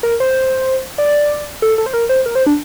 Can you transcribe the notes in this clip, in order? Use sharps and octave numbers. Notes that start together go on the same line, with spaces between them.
A#4
C5
D5
A4
A4
C5
A#4
C5
A#4
C5
D4